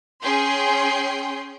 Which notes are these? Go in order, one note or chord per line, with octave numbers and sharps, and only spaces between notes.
C#4 G#4 G5 C6